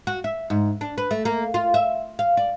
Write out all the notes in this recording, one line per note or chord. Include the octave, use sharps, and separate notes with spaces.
F#4
E5
G#2
D4
B4
A3
A#3
F4
E5
F5
D5